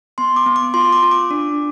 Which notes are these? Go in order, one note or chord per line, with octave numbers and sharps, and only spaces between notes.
B3 C6
D6
B3
D6
F4 C6
D6
F4
D6
D4